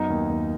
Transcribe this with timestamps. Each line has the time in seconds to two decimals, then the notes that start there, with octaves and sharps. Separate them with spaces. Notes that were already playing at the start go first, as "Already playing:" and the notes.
Already playing: F#2 B3 D#4
0.10 D#2
0.29 D#2